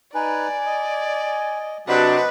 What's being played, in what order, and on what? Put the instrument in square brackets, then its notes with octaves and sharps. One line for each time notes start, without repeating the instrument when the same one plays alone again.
[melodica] D#4 B4 [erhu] D5 [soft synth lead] G#5
[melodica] D#5
[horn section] C3 F#3 D4 [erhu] B4 [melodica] C5 F#5 A5 [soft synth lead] D#5